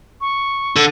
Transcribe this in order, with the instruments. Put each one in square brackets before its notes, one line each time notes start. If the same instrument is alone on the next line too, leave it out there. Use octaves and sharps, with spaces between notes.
[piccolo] C#6
[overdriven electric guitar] D3